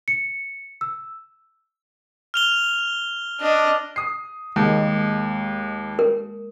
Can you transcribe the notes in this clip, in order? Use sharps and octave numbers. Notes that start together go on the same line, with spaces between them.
C#7
E6
F6 F7 G7
D4 D#5
D#6 C7
D#2 G#3 A#3
A#4